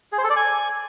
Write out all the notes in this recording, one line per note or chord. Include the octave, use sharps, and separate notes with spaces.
G#4
C5
A4
D5
G#5